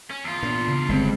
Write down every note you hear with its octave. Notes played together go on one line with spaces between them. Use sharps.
C#4
E2 F4
A#2 B3 D4
C#3
G1 G2 G#3 C4